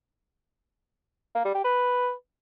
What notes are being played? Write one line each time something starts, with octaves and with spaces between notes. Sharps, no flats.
A#3
G3
G4
B4